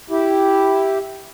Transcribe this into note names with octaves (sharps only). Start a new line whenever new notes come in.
E4 G4